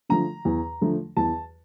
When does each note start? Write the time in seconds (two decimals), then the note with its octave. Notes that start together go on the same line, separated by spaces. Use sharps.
0.09 D3 F3 A3 A#5
0.45 E2
0.81 D3 F3 A3
1.17 E2 A5